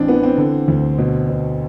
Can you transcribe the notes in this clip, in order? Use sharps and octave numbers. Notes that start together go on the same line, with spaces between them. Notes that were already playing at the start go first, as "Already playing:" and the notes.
Already playing: A1 C4 D4
E3 B3
C4
D3
D2
B2
B2